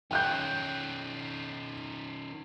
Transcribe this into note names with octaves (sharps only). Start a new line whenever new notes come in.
D#3 C#4 G5 F#6 G6